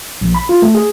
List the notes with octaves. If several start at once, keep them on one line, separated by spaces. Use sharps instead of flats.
A#1
B5
F4
A3
G#4